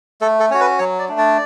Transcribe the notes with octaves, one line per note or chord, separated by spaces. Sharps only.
A3 A4
A4
C#4 F#4 C#5
B4
F#3 C#5
D5
A3 D4
D5